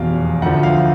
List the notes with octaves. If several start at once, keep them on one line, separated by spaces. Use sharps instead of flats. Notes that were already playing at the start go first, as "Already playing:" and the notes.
Already playing: F1 E2 B2 F5
D2 D3 F3 F#5
F5